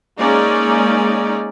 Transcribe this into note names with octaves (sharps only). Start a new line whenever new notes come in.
G#3 A#3 C#4 D#4 D5